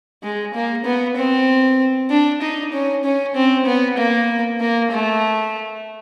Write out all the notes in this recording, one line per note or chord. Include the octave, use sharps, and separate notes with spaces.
G#3
A#3
B3
C4
D4
D#4
C#4
C#4
C4
B3
A#3
A#3
A3